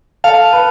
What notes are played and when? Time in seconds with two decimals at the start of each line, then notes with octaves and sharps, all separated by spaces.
0.24 A4 F5
0.53 B4